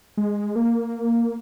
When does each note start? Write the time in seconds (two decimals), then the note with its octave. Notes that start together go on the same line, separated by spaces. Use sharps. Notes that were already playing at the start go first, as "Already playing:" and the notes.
0.17 G#3
0.56 A#3